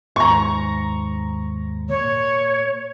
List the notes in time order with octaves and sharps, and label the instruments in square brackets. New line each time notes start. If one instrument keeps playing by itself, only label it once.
[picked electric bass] D#2 G#2 [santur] A#5 C#6
[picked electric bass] A#2 [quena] C#5